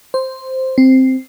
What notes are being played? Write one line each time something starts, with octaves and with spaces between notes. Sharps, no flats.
C5
C4